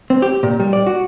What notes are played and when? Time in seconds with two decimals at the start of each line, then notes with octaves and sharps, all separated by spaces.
0.10 C4
0.22 G4
0.43 A#2
0.60 G3
0.73 D5
0.87 F#4